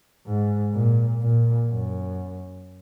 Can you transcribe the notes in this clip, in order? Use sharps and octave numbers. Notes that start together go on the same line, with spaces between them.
G#2
A#2
A#2
F#2